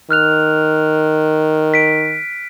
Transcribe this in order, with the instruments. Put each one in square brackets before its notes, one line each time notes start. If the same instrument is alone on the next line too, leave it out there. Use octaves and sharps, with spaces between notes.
[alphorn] D#3 [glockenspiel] F6 F#6 F7
[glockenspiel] B6 D7